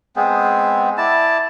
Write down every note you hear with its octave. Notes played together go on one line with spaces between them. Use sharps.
G#3 B3 C4 G#4
E4 D5 A5